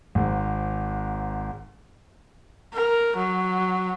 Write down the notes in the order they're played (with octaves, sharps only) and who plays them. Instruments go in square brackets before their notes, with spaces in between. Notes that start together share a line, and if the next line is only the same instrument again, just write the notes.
[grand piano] G#1 G#2
[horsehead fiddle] A#4
F#3